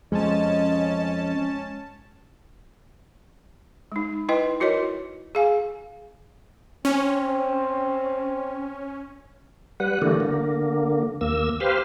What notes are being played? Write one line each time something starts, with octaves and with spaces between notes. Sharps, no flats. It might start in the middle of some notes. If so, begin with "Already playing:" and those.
F2 G#3 C#4 D#5 A5
G#3 D#4
E4 B4 D#5 G5
E4 F#4 A#4 C#5 D#5
G#4 F5 G#5
C4 C#4
G3 B4 F#5
D3 E3 G3 A3 A#3
D3 A#3
D#2 A#3 E6
G4 B4 C5 F5